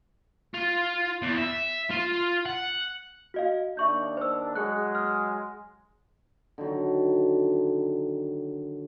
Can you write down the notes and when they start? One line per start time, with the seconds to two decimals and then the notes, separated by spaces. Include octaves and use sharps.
0.54 F4
1.22 E2
1.38 E5
1.91 F4
2.46 F#5
3.34 F#4 D#5 F5
3.77 D#2 D4 E5 C#6 G6
4.17 C5 E6
4.55 F#3 G#3 G#4 F#6
4.95 F6
6.58 D3 D#3 F#3